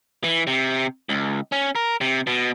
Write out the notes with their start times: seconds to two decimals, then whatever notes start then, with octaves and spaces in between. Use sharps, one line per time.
0.24 E3
0.47 C3
1.09 C#2
1.52 C#4
1.75 A#4
2.01 C3
2.27 B2